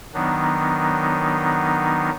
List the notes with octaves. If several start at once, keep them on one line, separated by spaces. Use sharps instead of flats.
D#3 F#3 B3 D4 D#4